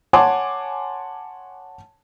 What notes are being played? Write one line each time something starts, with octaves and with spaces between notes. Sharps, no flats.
C#5 F#5 G#5 A5 C6 D6